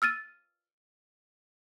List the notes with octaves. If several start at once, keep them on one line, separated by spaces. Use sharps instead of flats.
E6 F6 A6 D#7